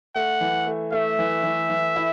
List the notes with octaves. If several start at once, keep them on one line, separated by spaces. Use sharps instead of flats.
A3 F#5
E3
A3
A3 E5
E3
E3
E3
E4